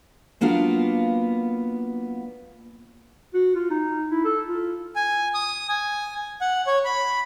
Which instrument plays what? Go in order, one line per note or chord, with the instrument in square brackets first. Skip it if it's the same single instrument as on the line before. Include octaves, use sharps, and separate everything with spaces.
[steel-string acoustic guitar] F#3 A#3 B3 D4 F4 F5
[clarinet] F#4
F4
D#4
E4
A4
F4
[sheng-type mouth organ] G#5
D#6
G#5
F#5
C#5
B5